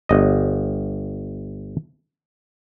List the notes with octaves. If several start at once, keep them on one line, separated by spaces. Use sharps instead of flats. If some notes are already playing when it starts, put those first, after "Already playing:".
G1 D#5